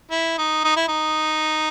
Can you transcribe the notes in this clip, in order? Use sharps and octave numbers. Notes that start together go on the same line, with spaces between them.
E4
D#4
D#4
E4
D#4